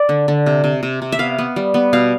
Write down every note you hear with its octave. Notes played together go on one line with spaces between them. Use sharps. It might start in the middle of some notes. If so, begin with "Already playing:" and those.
Already playing: D5
D3
D3
C3
C3
C3
C3
E5
B3 F5
B3
G3
B3
B2 F5